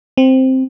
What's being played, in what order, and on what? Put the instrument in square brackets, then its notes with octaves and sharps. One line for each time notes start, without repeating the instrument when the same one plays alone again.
[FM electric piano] C4